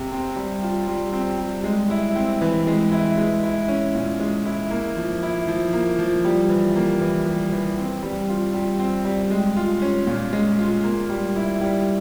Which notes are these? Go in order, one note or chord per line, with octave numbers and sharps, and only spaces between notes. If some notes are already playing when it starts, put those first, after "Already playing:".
Already playing: C3
C4
G3
F4
G3
C4
G3
G#3
E4
C4
E3
G#3
E4
G#3
E4
C#4
A#2
G#3
E4
A#3
F3
E4
F3
A#3
F3
G3
E3
A#3
E3
G3
E3
C4
G3
F4
G3
C4
G3
G#3
F4
C#4
A#2
G#3
F4
A#3
G3
E4
G3